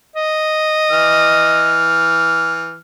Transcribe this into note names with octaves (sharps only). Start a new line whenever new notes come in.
D#5
E3 F6